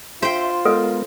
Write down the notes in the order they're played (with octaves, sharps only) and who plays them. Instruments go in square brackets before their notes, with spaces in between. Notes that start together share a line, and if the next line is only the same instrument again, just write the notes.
[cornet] F4 [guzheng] C5 G5 [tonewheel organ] E5
[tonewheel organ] G#3 B3 A#4 [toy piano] A4